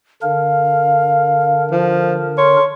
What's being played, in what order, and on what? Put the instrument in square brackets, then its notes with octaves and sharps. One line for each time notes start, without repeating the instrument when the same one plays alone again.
[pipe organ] D3 D4 A#4 [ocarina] F5
[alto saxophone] F3
[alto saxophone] C#5 [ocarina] C6